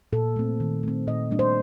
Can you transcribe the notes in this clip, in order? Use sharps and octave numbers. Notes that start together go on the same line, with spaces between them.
A#2 A4
A3 C4
D#3
A3 C4
A#2 D#5
G3 A#3 D4
C5